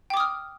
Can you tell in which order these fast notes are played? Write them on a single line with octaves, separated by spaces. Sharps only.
G5 D6 D#6 F6